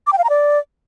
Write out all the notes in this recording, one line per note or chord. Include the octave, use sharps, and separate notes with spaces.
D6
G5
F5
A#5
D5